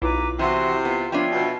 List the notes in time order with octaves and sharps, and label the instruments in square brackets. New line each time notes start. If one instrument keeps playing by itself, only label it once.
[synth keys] B1 E4 F4 [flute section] B4 A#5 D6
[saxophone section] C3 [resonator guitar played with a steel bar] E3 F#5 [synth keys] E4 [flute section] F#4 E5 C6
[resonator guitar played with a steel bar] B3 [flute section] F4
[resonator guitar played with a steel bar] F3 B3 D4 [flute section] F4 C#5 E5 [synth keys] G5
[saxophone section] B2